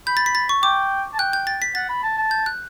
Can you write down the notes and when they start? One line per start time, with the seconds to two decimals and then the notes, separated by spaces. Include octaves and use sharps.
0.07 B5 G6
0.17 A6
0.26 B6
0.35 A6
0.49 C#6
0.63 G5 D6
1.14 A5
1.19 G5 F#6
1.33 G6
1.47 A6
1.62 B6
1.75 F#5 A6
1.89 B5
2.03 A5
2.17 A5
2.31 G6
2.46 F#6